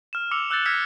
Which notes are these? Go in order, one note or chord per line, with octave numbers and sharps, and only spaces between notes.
F6 E7
D6 E6 C#7 F7
E6 F#6 G6 A6 C#7
E6 F6 G#6 A#6 B6 C#7